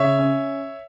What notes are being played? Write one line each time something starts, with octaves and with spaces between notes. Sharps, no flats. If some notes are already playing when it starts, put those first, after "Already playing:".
Already playing: C#3 C#5 E5
C#4